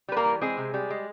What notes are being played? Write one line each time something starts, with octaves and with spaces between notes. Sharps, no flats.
G3 B4
A#3 A#4
E3
G#3 C4 G#4
C3
G3
G#3